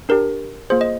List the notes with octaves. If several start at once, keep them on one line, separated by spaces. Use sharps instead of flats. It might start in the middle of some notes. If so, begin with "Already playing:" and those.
D4 G4 A#4
A#3 F4 G#4 C5
D#5